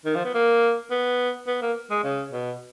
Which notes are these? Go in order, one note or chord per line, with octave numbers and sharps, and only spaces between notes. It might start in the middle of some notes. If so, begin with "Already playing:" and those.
D#3
F3
B3
A#3
B3
B3
A#3
G#3
C#3
B2